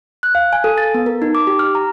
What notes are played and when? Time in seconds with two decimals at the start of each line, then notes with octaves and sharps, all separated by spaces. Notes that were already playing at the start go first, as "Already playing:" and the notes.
0.23 F#6
0.35 F5
0.53 G#5
0.64 A4
0.78 A6
0.94 B3
1.06 A#4
1.22 D#4
1.35 D6
1.47 G4
1.59 F6
1.75 A#5